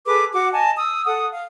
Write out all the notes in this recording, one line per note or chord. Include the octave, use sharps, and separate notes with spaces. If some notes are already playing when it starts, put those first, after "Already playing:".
G#4 A4 B4 D6
F#4 F#5 D6
D#5 G#5 A5
D#6 E6
A4 F#5 D#6
F5